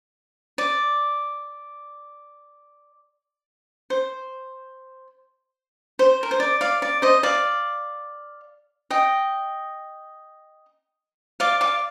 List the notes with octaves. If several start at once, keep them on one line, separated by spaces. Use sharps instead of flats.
D5
C5
C5
A#4
C5
D5
D5 F5
D5
C5 D#5
D5 F5
D#5 G5
D5 F5
D5 F5